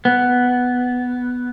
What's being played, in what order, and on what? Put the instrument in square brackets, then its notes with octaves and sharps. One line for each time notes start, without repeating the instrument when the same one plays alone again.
[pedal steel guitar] B3